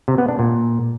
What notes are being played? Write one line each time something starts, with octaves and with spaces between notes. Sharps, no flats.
C3
B3
D4
A#2